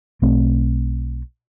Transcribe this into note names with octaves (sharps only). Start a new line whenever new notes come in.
B1 A3 C4